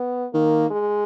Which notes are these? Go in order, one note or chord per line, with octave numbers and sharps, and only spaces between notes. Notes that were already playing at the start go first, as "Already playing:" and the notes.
Already playing: B3
D#3 A#3
G#3